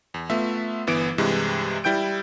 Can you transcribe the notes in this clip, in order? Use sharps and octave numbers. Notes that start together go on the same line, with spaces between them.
E2
A3 B3 F4 E5
G1 E3 B3 D7
G2 C3 E3 G#3
G3 E4 G5 G6 D7